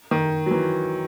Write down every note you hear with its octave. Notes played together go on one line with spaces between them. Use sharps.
D#3
F#3
E3